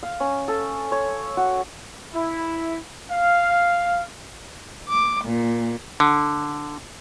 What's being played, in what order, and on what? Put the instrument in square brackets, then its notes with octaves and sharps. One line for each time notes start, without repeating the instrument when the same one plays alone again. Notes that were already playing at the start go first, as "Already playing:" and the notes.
[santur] F5
C#4
A4
C#5
F#4
[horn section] E4
F5
[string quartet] D6
A#2
[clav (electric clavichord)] D3